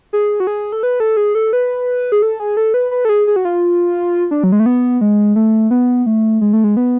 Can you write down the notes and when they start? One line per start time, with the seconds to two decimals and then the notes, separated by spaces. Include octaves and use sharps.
0.13 G#4
0.40 F#4
0.47 G#4
0.72 A4
0.83 B4
1.00 A4
1.17 G#4
1.35 A4
1.53 B4
2.12 G#4
2.22 A4
2.40 G#4
2.57 A4
2.74 B4
2.91 B4
3.05 A4
3.09 G#4
3.27 G#4
3.36 F#4
3.45 F4
4.31 D4
4.44 F#3
4.52 G#3
4.60 A3
4.66 B3
5.01 G#3
5.36 A3
5.71 B3
6.06 A3
6.41 G#3
6.53 A3
6.64 G#3
6.77 B3